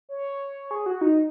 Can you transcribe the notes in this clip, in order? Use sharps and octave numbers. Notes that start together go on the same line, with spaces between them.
C#5
G#4
F#4
D#4